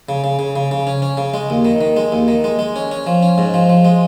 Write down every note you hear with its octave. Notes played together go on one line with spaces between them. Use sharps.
C#3
C#3
C#3
C#3
C#3
C#4
C#4
C#3
G#3
D#2
D#3
D#3
G#3
D#2
D#3
G#3
G#3
C#4
C#4
F3
C#4
G#2
F3
F3
G#3